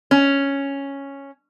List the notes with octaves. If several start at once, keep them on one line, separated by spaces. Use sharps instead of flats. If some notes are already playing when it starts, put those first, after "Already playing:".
C#4